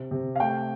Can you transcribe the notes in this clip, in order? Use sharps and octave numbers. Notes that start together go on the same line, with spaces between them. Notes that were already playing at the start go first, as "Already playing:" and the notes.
Already playing: C3
C3
F5
A3 G5